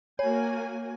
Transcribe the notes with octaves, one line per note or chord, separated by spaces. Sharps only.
A#3 F#4 C#5 G#5